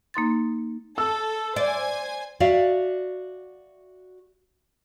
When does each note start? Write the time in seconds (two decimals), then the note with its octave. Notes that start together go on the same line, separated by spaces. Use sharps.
0.14 A#3 D#4 C6 A6
0.98 A4 E6
1.56 C5 D5 G#5
2.40 F#4 D5 E5 F5